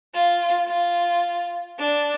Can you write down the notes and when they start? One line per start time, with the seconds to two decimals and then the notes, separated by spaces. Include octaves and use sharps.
0.14 F4
0.68 F4
1.79 D4